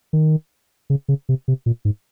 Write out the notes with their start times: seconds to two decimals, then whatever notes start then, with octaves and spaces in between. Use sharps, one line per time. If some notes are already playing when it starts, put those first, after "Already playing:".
0.13 D#3
0.90 C#3
1.08 C#3
1.29 C3
1.48 C3
1.66 A#2
1.85 G#2